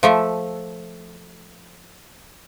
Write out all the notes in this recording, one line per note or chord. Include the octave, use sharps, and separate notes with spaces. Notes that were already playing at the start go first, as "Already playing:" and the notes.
F3 A3 E5